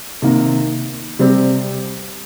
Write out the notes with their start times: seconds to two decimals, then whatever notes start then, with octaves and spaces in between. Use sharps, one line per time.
0.22 C3 D#3 A#3 D#4
1.19 C3 G3 C4 G4